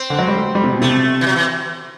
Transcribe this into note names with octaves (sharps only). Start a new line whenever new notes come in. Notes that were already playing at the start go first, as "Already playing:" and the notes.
Already playing: C4
D3
F#3
G3
A3
G3
C3
B2
C3 A3
E3
F#3
E3